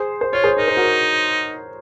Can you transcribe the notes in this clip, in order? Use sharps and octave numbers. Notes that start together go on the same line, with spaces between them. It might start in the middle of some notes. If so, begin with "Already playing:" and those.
Already playing: G#4 C5
C5
F4 C#5
G#4 C5
D#4 A#4
C5
F#4 A#4